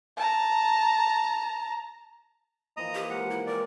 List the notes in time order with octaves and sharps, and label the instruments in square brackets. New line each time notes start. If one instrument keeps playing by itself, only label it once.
[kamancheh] A5 A#5
[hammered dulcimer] E3 F3 A#3 [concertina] D#5 A#5 D#6
[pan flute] G4
[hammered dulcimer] G#3 A#4 [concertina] F#5
[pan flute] E4
[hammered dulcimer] F#3 G#3 G4 [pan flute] A#4 [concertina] D5